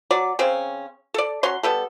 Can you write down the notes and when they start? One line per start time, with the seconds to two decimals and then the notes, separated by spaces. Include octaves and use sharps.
0.11 F#3 D5
0.39 C#3 C4 C#4
1.14 A4 D5
1.43 F#3 C#4 C6
1.63 G3 B3 A4